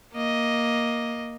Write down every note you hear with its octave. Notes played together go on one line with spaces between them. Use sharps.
A#3 D#5